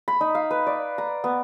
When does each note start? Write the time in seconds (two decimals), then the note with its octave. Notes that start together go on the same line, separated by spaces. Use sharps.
0.08 B5
0.21 D#4
0.35 F5
0.51 B4
0.67 D5
0.98 A#5
1.24 B3